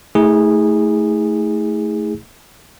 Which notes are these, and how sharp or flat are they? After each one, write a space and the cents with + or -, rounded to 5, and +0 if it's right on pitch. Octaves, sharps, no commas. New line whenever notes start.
A3 +0 E4 -45 G#4 -15